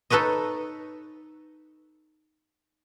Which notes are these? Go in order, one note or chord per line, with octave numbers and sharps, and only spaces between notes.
D#4 A4 B4 C#5 D#5